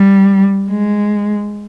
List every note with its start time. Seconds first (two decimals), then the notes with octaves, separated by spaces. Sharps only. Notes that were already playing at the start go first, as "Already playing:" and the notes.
Already playing: G3
0.70 G#3